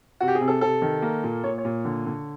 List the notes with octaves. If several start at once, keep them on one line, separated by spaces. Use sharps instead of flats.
C3 F#4
G4
G#4
C3
A4
C3 A4
D#3
A#3
A#2
A#2 C#5
C#5
A#2
D3
D3